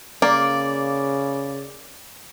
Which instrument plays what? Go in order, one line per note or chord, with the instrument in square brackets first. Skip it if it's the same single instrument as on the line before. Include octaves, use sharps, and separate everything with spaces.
[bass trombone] C#3 [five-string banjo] A#3 [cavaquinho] D5